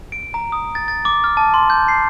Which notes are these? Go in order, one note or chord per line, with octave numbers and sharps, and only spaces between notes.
D7
A#5
D#6
A6
A6
D6
F6
A5
C6
G6
C7